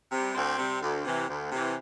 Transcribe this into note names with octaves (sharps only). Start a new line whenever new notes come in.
C3 G3
D2 C4
C3 G3
D2
C3 E3
D2
C3 E3